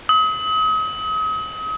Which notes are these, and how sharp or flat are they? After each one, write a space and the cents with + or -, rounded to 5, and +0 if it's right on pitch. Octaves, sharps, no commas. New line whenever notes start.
D#6 +40